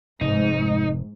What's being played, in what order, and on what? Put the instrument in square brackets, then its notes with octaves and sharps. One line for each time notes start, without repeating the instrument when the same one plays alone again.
[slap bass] F1 [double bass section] G#2 [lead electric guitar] D#4